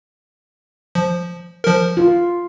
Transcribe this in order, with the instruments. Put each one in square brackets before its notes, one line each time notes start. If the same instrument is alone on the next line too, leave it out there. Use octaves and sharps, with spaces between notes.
[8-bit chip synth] F3
F3 A#4
[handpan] F4